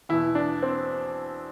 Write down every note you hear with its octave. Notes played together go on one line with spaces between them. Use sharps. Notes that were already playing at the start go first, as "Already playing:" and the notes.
E2 B2 E4
D4
C4